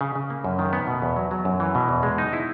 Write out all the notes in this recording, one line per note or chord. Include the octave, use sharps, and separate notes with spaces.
C#3
C#3
A#3
F#2
D#3
B3
B2
E2
F#3
F#3
F#2
E3
B2
E2
G#3
D#4
E4